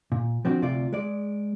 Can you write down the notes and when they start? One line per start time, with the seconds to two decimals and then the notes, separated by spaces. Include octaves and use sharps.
0.12 A#2
0.45 F3 C4 D4 F#4
0.62 D2 C3 F4 D5
0.93 G#3 D5